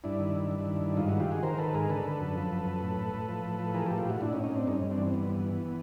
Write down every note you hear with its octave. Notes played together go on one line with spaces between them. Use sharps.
G2 D4 E4
D#3
G2
G2
D#3
G2
G#2 D#4 F4
D#3 E4 F#4
F4 G4
D#3 F#4 G#4
D#3 A#4 C5
D#3 A4 B4
G#2 G#4 A#4
D3 A4 B4
D3
F#2
F3
F#2
F#2
A2
A2
A2
F3
A2
F3
E3 G#4 A#4
A2 G4 A4
F4 G4
A2 E4 F#4
A2 D4 E4
C#4 D#4
A2
C#4 D#4
A2 C4 D4
G2 C#4 D#4
G2
C4 D4
E3
C4
G2 B3
E3
E3